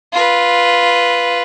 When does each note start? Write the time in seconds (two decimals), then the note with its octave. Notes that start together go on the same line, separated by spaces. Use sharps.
0.13 F4 B4